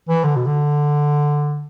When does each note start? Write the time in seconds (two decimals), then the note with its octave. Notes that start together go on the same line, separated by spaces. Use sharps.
0.09 E3
0.24 D3
0.36 B2
0.47 D3